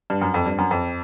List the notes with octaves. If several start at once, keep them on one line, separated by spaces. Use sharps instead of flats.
G2
F#2
F2
G2
F#2
F2